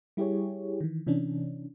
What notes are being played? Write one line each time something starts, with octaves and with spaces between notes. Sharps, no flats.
G3 E4 G4 G#4 C#5
D#3 E3
C3 E3 C#4 D4